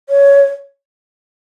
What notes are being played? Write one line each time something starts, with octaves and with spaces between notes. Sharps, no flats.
C#5